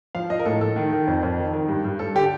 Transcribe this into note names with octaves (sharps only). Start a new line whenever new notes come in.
F3 F5
F3 D#5
A#4
A2 A4
A2 A4
D#3
D#3
F2
F2
D#3
D#3
G2
G2
G2 A4
D3 G4